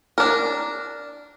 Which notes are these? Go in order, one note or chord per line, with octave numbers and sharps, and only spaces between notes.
D4 A#4